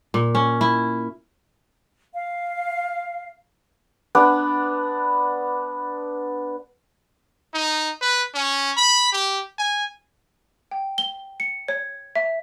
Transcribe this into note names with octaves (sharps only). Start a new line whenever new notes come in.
A#2
C#4
E4
F5
B3 D4
D#4
B4
C#4
B5
G4
G#5
G5
G7
C#7
C#5
E5